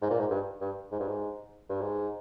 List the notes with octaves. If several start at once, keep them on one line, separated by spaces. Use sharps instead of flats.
G#2
A#2
G#2
G2
G2
G#2
G2
G#2
G2
G#2